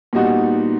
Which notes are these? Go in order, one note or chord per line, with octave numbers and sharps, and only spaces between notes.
A#2 G3 B3 D#4 F#4